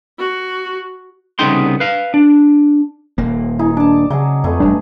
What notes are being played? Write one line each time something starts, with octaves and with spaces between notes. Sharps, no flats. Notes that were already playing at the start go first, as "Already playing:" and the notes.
F#4
C2 C#3 B3 D#4 G5 C6
B4 F5
D4
D#1 A#3
D#4 E4 G#4
D4 D5 A5
C#3 F#3 D#4 G#4
F2 A3 G#4 B4
E1 F#2 G3 D4